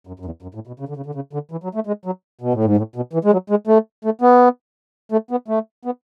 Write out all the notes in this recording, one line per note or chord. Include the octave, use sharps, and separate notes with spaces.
F#2
F#2
E2
F#2
A2
B2
C#3
D3
C#3
D3
C#3
D3
E3
F#3
A3
G#3
F#3
B2
A2
G#2
A2
B2
E3
G#3
F#3
G#3
A3
A3
B3
A3
B3
A3
B3